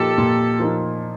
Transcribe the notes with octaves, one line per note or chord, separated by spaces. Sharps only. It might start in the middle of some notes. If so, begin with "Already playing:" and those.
Already playing: A#2 F3 A#3 D#4 G4 A4
A#2
F3 A#3 D#4